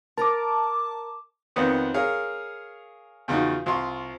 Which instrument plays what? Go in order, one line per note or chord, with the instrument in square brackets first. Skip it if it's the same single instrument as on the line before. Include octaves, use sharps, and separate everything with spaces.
[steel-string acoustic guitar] A#4 A#5 [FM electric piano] A5 D6
[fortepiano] F2 D#3 B3 C4 C#5 D#6
G#4 A#4 C#5 F5
E2 C#3 F3 D#4 F#4
C2 F4 C6 C#6